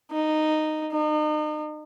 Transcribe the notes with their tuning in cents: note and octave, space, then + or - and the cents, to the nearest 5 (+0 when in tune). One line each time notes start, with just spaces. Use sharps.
D#4 -10
D#4 -40